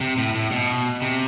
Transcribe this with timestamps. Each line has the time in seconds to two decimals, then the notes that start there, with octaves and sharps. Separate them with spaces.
0.01 C3
0.18 A2
0.35 A2
0.52 B2
1.02 C3